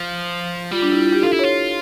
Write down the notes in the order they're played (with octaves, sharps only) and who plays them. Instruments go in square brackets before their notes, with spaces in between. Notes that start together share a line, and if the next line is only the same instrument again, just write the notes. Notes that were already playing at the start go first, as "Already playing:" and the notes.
Already playing: [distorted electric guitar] F3
[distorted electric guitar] G3 [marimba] F4
[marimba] D4
E4
F4
G4
[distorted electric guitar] F4 [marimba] A4
[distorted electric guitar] E4
[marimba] C#5
[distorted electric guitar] F4